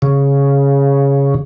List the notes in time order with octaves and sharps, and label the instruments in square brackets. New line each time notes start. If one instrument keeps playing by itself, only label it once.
[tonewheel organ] C#3